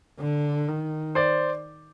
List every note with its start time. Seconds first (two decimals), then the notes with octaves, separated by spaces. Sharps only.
0.21 D3
0.68 D#3
1.15 C5 D5